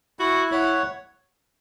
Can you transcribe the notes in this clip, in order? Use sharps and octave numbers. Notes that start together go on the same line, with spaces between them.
E4 F#4
E4 C#5 F#5